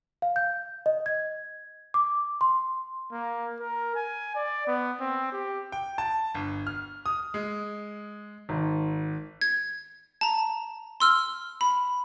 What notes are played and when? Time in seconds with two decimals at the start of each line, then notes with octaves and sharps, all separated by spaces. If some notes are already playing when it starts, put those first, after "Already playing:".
0.22 F5
0.36 G6
0.86 D#5
1.06 G#6
1.94 D6
2.41 C6
3.12 A#3
3.60 A#4
3.95 G#5
4.35 D5
4.67 B3
5.00 C4
5.32 G4
5.72 G5
5.98 A5
6.35 G1
6.67 F6
7.06 D#6
7.34 G#3
8.49 G#1
9.41 G#6
10.21 A5 A#5
11.00 C6 E6 F6
11.61 B5